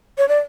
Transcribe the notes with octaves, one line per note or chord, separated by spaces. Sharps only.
C#5
D5